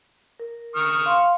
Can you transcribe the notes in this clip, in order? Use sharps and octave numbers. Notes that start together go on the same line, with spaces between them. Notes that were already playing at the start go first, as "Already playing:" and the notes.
A#4
C#6 D#6 F6
F5 C6